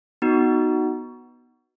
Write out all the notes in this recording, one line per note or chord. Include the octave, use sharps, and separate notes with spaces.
B3 D#4 F#4